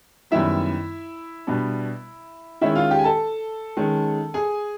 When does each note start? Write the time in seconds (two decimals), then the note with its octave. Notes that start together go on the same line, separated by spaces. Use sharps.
0.31 F#2 D#3 G3 B3 E4 E5
1.47 B2 G3 B3 D4
2.61 D#3 G#3 C#4 E4 E5
2.75 F4 F5
2.91 G4 G5
2.99 G#5
3.04 A4 A5
3.77 D#3 G#3 C#4
4.34 G#4 G#5